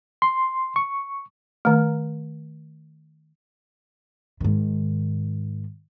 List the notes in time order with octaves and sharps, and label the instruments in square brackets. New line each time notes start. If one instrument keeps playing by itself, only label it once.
[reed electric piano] C6
C#6
[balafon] D#3 A3
[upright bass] G#2 D#3